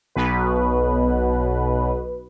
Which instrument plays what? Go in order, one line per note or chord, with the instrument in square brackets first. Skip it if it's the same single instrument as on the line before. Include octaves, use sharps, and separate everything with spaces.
[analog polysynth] B1 B2 B4